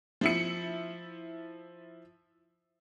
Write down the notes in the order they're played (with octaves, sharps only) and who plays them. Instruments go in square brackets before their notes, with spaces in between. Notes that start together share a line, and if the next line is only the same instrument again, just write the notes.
[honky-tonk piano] F3 E4 C#7